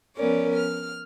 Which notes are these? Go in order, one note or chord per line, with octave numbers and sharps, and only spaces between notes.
F3 B3 C#4 A#4 C#5 D5
F6